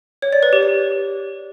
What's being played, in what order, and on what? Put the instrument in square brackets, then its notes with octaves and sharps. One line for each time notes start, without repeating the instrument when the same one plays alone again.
[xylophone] C#5
D5
B4
G4
D5